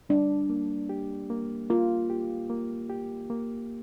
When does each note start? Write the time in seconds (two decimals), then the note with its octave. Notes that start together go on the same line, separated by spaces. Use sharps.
0.09 G3 D4
0.50 A#3
0.89 G4
1.30 A#3
1.70 A#3 F4
2.10 G4
2.50 A#3
2.89 G4
3.30 A#3